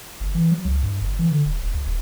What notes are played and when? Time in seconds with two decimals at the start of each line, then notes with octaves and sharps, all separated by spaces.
0.20 G1
0.34 E3
0.51 F#3
0.65 C#2
0.83 G2
1.01 G1
1.19 E3
1.31 D3
1.45 D1
1.62 D1
1.74 D2
1.87 D1